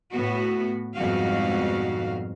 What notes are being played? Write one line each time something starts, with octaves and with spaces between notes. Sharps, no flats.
A2 B3 F#4
F2 G#2 B2 G3 F#4 F5